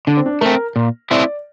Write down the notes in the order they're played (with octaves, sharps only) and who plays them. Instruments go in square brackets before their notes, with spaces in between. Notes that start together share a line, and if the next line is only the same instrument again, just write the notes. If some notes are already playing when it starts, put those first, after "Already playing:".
[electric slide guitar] D3 [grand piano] D4
[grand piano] C4
D4
[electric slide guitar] A3 C4 [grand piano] A#4
[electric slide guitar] A#2
[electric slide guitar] A3 C4 E4 [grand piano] D5